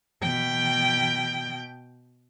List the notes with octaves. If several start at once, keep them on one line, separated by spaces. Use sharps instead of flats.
B2 G5